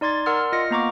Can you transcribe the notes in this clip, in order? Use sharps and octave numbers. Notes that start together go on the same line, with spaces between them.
D#4 D5 C6 G#6 A6
A#4 D5 F#5 C6 E6 F6
F4 D#5 F6 A#6 C#7
A#3 B3 A#5 C#6 D6